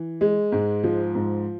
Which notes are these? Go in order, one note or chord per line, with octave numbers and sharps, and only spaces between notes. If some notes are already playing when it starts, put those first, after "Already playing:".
Already playing: E3
G#3
G#2
F3
G#2